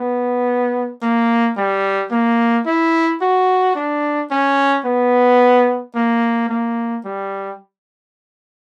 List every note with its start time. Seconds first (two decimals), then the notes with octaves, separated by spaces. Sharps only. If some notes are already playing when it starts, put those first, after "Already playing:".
Already playing: B3
1.02 A#3
1.57 G3
2.11 A#3
2.66 E4
3.21 F#4
3.75 D4
4.31 C#4
4.85 B3
5.95 A#3
6.49 A#3
7.05 G3